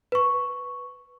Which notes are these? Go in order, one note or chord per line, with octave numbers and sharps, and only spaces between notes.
B4 C#6